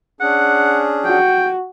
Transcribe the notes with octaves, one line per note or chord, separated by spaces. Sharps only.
C#4 D4 G#4 F#5
F#4 G5